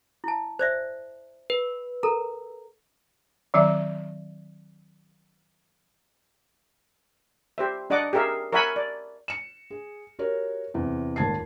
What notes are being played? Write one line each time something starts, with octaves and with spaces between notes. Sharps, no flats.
E4 A5
C5 D5 E5
B4
A4 A#4 A#5
D#3 F#3 C4 D5 E5
G4 C5 E5
D4 D5 D#5 F#5 D6
G4 G#4 A#4 E5 F5
A#4 C#5 E5 F#5 G#5 B5
D5
C#7 E7
G#4
F#4 G4 A#4 C#5
E2 C3
D#1 D#2 G#2 A5 G#6 C7